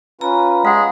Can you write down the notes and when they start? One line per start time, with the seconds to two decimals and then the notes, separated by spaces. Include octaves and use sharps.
0.21 C#4 F4 B4 A#5
0.65 G#3 F5 F#5